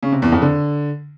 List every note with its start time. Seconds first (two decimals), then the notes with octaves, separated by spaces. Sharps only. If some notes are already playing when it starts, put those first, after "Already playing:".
0.03 C#3
0.12 C3
0.22 E2
0.32 F2
0.42 D3